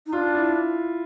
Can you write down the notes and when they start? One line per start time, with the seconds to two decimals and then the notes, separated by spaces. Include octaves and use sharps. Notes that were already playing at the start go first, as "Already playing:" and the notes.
0.06 D#4
0.12 D4 F4
0.35 E4